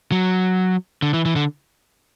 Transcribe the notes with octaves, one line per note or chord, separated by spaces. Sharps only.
F#3
D3
E3
E3
D3